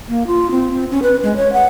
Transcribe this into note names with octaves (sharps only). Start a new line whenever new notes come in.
A#3
F4
C4
C4
C#4
B4
G#3
C#5
F#5